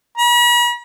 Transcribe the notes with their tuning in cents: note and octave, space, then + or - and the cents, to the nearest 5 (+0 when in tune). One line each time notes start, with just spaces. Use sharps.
B5 -45